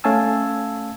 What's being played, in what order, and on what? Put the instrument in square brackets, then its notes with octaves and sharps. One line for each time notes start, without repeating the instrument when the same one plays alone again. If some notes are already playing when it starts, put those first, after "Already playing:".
[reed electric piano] A3 C#4 F5 G#5 A5 E6